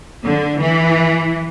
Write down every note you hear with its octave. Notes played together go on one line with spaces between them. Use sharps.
D3
E3